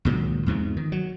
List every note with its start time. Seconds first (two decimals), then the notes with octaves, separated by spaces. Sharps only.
0.05 C#2 A#2 D#3 F#3
0.46 E2 G#2 C3 F3
0.77 D#3
0.92 F#3